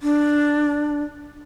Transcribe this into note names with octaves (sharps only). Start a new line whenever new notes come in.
D4